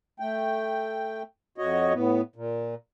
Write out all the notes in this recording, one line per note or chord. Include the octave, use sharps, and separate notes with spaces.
A3 G5
F2 F#4 C#5 D#5
A2 B3
A#2